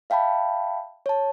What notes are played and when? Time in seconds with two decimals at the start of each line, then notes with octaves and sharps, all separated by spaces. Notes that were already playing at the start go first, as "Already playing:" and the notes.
0.10 E5 F5 G5 A5 B5
1.06 C#5 A5